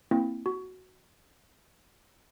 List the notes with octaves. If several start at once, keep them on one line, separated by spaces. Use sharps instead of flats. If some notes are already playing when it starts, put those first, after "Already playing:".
A#3 C4 E4
F#4